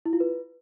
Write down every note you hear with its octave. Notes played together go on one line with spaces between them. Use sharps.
E4
F4
B4